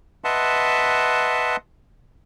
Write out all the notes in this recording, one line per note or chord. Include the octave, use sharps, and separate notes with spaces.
B4 D#5 E5 F#5 A5 C6